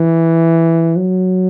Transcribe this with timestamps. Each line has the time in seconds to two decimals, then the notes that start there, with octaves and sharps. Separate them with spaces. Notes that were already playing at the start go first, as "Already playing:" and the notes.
Already playing: E3
0.97 F#3